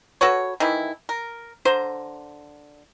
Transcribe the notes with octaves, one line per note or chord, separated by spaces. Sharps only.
F#4 A4 B4 C#5
D#3 E3 A3 E4
A#4
D3 C5 A#5